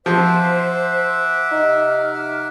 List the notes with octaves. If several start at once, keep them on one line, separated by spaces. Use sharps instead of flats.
F3 C5 E5 F#5 D6
C3 D#4 F6